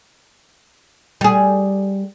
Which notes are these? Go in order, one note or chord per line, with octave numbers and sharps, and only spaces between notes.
G3 G#4